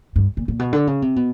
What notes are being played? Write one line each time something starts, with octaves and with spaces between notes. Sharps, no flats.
G2
A#2
A#2
B2
D3
C#3
C3
B2